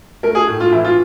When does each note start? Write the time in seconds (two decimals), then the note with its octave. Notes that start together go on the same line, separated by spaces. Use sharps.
0.23 A3 A#4
0.35 G#4
0.47 A2
0.60 F4
0.72 E3 E4
0.84 F4